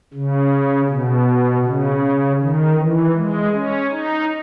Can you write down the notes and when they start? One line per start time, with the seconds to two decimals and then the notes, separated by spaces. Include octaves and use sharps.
0.14 C#3
0.89 B2
1.65 C#3
2.40 D#3
2.78 E3
3.15 G#3
3.53 C#4
3.91 D#4